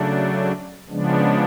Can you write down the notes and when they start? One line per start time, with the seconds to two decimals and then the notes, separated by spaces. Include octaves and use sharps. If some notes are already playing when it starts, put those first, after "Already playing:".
Already playing: C#3 F#3 A3 D4
0.89 C#3 F3 G#3 B3 D4